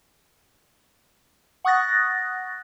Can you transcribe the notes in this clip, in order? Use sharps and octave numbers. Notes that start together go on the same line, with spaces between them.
F#5 C#6 D#6 F#6 A6 A#6